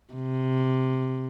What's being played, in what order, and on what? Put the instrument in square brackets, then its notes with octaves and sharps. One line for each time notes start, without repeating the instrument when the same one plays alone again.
[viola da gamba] C3